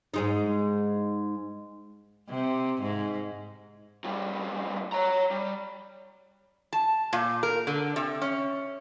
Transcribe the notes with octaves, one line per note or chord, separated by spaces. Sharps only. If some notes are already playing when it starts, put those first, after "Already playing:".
G#2 G#3 D#4
C3
G#2
A2 G3
C#5 A#5
G3
A5
A#2
A#4
D3
C3
C#4